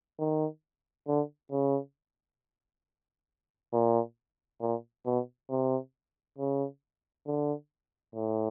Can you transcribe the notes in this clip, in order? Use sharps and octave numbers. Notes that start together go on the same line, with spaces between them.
D#3
D3
C#3
A#2
A#2
B2
C3
C#3
D3
A2